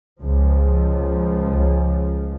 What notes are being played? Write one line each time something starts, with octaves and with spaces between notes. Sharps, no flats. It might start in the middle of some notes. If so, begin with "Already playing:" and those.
C#2 F3